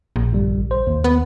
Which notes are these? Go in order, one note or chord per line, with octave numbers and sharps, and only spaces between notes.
A#1
G1 G3
C5
D#2
B3